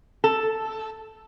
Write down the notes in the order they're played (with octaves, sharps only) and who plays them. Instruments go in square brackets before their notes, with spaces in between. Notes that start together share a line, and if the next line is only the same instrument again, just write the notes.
[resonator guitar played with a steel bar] A4